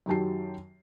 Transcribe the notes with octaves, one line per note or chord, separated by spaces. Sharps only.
F#2 D#3 F#3 G4 A5 C7